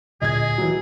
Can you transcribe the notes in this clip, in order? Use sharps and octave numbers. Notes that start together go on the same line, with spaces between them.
D1 A#2 D3 G#4 D#5 G#6
E3 F#3